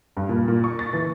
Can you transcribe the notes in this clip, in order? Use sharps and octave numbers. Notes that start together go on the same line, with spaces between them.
G2
A#2
A#2
C#6
A6
E3